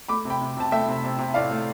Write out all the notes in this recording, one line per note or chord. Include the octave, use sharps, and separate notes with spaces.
A3 B5 D6
C3
G5 B5
C3
C3 A5
A3 E5 G5
C3
C3
C3
A2 D5 F5
A3